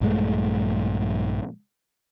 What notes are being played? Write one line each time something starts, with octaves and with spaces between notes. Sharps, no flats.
A#1 G2 G#3 A3